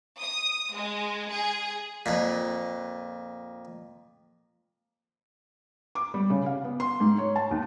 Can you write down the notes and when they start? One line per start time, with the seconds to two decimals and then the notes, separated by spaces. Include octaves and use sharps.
0.19 D#6
0.74 G#3
1.30 G#4
2.06 F2 A#2
5.95 D6
6.14 G3
6.30 C#3
6.46 F5
6.64 B3
6.80 C6
7.00 G#2
7.18 C#5
7.36 A5
7.51 D#2